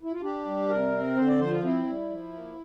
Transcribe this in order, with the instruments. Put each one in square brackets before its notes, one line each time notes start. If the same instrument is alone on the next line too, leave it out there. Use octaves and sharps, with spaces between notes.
[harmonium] E4
F4
D4 G4
G3
C3 A#4
C4
D3 C5
D5
F3 C5
F4
C4 E4
G3
F3
A#3